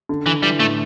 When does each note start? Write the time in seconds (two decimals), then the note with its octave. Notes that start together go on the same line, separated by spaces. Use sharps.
0.09 D3
0.26 D3 E3
0.43 E3 G3
0.60 A2 A3